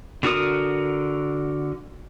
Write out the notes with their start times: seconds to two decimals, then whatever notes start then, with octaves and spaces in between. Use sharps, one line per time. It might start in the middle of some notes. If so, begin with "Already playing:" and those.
0.23 D3 F#4 A#4 D#6